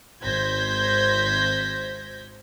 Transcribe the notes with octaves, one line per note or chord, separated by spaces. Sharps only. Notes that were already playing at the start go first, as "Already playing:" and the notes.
G#1 C5 G6 G#6 A#6 B6